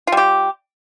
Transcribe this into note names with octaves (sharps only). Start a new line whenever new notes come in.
G3 F4 G4